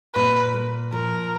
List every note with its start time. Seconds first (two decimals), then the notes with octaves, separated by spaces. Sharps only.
0.15 A#2 B4
0.54 A#3
0.92 F3 A#4